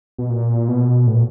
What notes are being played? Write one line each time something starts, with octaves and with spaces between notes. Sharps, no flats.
B2
A#2
B2
A2
A#2